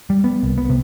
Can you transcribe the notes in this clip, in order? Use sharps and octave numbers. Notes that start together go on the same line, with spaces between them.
G3
B3
C2
B3
C3